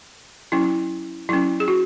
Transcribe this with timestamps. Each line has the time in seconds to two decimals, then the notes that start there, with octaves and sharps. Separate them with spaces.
0.52 F#3 C#4 E4
1.29 F#3 C#4 E4
1.60 G#4
1.68 F#4